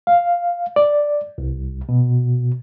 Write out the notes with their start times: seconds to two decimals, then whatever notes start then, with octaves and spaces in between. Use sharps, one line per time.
0.07 F5
0.76 D5
1.38 C2
1.89 B2